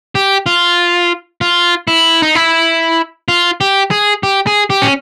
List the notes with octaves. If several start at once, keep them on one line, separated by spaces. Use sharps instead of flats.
G4
F4
F4
E4
D#4
E4
F4
G4
G#4
G4
G#4
G4
C#4